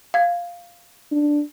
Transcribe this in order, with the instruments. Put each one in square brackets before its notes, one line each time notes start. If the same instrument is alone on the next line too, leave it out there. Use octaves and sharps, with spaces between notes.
[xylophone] F5 G#6
[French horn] D4